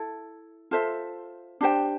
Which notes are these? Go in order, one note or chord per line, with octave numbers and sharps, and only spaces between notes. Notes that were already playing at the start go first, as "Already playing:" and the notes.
Already playing: E4 A4
F4 A4 C5 E5
D4 G4 C5 G5